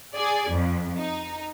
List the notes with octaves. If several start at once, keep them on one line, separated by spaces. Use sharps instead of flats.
G#4 D5 G#5
F2
D#4